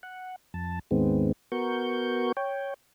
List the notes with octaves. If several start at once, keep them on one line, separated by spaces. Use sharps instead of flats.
F#5
F2 A5
D#2 G#2 D#3 G#3 B3 C4
B3 F#4 A#4 C#6 G6
C#5 G5